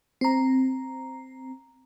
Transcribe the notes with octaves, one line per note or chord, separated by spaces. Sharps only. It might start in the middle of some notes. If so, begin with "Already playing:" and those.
C4 A#5